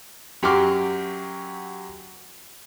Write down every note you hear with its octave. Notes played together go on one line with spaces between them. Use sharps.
F#2 F#3 G4 C6 D6 F6